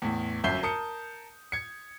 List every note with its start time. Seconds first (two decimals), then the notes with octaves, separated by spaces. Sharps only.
0.02 E2 A2
0.44 G1 F#2 E5 G6 C7 G7
0.63 A#4 A5 D#6 C#7
1.52 G#6 C#7